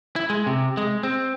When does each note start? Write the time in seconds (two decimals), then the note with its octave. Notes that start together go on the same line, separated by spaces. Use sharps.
0.16 E4
0.30 G#3
0.47 C3
0.77 G#3
1.03 C4